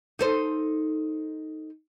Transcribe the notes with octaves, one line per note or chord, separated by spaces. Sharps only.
D#4 A4 C5